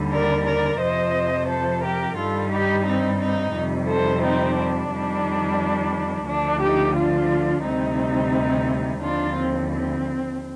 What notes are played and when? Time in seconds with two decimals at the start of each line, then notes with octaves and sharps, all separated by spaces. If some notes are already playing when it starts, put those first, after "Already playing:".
Already playing: D#2 D3 G3
0.11 A#4 D5
0.46 A#4 D5
0.80 F2 C3 F3 C5 D#5
1.48 A4 C5
1.83 G4 A#4
2.17 G2 D#3 G3 F4 A4
2.51 D#4 G4
2.86 C4 D#4
3.19 C4 D#4
3.54 F2 C3 D#3 G3
3.88 A4 C5
4.23 C4 D#4
4.57 D4
4.91 F2 D#3 G3
6.27 D2 D3 F3 D4
6.62 D#4 G4
6.96 D4 F4
7.65 D2 C3 D#3 G3 C4 D#4
9.01 D#2 D3 F3 D4 F4
9.36 C4
9.71 C4